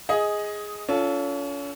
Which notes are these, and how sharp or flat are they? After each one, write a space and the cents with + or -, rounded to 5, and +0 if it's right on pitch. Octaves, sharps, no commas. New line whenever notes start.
G#4 +0 D#5 +15
C#4 +35 F4 -5 A4 +0